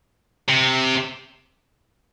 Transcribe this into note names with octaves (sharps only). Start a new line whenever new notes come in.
C3